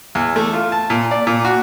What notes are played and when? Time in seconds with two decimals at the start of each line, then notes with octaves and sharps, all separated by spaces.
0.15 E2
0.36 A3
0.53 F4
0.72 A5
0.90 A#2
1.11 D5
1.27 A#2
1.45 F#4